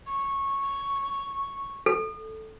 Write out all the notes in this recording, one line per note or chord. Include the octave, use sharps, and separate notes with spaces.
C#6
A4